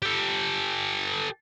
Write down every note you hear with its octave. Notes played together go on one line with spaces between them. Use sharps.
G4 A4